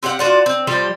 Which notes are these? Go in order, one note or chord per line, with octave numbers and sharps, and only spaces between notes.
C4 G4 F5 F#5
D4 F4 F#4
C4
F3 G3 G4 C5